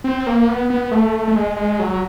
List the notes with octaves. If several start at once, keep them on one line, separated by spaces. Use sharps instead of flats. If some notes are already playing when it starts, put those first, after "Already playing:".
C4
A#3
B3
B3
A3
A3
G#3
G#3
F#3